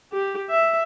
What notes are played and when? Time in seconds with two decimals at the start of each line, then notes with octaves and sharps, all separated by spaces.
0.12 G4
0.50 E5